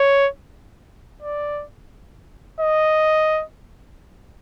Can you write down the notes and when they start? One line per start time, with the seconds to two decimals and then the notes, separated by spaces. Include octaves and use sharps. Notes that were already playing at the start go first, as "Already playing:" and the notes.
Already playing: C#5
1.22 D5
2.60 D#5